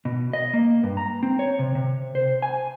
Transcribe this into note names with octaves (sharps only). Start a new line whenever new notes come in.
B2
D#5
A#3
G2
A#5
C4
C#5
C3
C3
C5
G#5